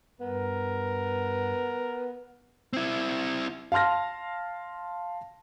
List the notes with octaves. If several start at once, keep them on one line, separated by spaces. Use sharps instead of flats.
G2 B3 A#4
C4 E4
F5 A5 C6 F6 A#6